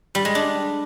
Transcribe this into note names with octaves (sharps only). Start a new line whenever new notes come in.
G3
G#3
D4